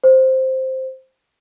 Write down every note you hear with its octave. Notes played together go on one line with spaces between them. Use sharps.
C5